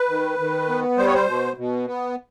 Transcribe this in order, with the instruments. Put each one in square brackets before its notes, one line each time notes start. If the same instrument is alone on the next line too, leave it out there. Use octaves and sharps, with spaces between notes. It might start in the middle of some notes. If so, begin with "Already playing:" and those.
Already playing: [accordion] B4
D#3
D#3
B3
G3 C5
C#5
C5
B2
B2
B3